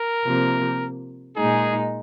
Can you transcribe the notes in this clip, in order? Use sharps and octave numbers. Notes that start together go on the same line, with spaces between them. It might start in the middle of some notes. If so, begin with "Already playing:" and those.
Already playing: A#4
C3 F3 A#3
A#2 G#3 D#4 G#4